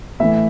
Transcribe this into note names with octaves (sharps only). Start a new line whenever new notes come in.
A2 E3 A3 E5